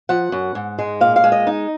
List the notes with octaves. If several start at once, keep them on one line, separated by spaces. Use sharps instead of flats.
F3 F#5
F#2
G#2
G#3
A#2 F5
F5
G#3
D#5
D#4